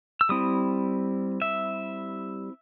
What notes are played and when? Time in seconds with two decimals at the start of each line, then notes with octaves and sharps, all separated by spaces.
0.21 E6
0.29 G3 C4 E4 D#6
1.42 E5